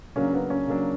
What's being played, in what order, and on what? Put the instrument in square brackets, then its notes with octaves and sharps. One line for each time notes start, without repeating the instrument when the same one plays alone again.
[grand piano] C#3 F#3 A#3 D4 [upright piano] C#4
[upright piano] B3
C#4
[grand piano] C#3 F#3 A#3 D4